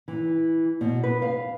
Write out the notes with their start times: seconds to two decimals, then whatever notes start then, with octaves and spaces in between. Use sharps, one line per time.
0.08 E3
0.81 B2
1.03 B4
1.22 F5